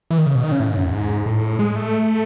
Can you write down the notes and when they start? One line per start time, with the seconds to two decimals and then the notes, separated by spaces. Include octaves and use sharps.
0.11 E3
0.18 D#3
0.26 C#3
0.35 B2
0.44 D#3
0.52 C#3
0.60 A2
0.69 G#2
0.77 F#2
0.85 E2
0.93 G#2
1.26 A2
1.59 G#3
1.76 A3